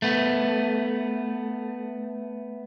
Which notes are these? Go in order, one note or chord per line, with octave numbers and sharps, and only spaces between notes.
A3 B3